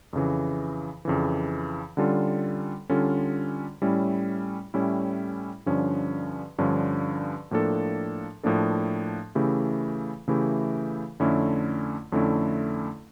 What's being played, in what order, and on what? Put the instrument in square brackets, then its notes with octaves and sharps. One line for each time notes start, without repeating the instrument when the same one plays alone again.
[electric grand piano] F2 C#3 E3
F2 C#3 E3
D3 G3 C#4 F4 A4
D3 G3 C#4 F4 A4
A2 G3 C#4 E4
A2 G3 C#4 E4
G2 D3 F3 C#4
G2 D3 F3 C#4
A2 F3 A#3 D4 A4
A2 F3 A#3 D4 A4
C#3 E3 A3 E4 G4
C#3 E3 A3 E4 G4
F2 D3 A3 C#4 E4
F2 D3 A3 C#4 E4